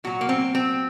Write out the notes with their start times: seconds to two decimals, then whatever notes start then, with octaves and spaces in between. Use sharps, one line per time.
0.04 A#2 F#3 F#4
0.21 A#3
0.29 C4
0.55 C4